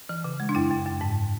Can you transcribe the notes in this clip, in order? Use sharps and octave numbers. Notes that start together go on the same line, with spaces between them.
E3
C#3
G#3
D4
F#2 E4
F#2
F#2
G#2